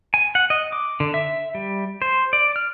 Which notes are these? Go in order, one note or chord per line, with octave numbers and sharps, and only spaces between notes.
G#5
F#5
D#5
D6
D3
E5
G3
C5
D5
F6